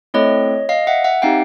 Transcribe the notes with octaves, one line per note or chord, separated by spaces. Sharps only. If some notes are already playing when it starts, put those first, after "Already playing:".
A3 C4 E4 A4 C#5 D#5
D#5 F5
E5 F#5
E5 F#5
C4 D#4 G4 F5 G5